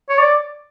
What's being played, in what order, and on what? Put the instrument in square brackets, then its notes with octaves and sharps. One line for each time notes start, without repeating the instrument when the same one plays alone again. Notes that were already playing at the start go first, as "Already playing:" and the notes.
[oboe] C#5
D5